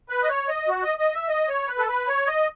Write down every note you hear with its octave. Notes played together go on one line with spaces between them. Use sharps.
B4
D#5
C#5
D#5
F#4
D#5
D#5
E5
D#5
C#5
B4
A4
B4
C#5
D#5